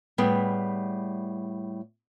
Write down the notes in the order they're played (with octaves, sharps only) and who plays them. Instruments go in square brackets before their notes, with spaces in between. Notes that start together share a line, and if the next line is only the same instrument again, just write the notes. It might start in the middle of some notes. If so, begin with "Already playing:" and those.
[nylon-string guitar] A2 G3 B3 G#4 G5